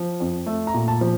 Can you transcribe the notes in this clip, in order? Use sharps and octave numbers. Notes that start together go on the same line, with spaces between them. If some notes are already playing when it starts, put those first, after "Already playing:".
Already playing: F3
F2
A3
A#5
A#2
A5
F3